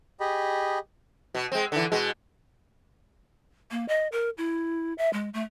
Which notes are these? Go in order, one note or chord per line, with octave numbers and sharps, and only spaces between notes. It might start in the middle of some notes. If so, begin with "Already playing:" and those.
G4 G#4 D#5 B5
B2
G#3 C4
D3 E3
B2 G#3
A#3
D#5
A#4
E4
E5
G#3
A3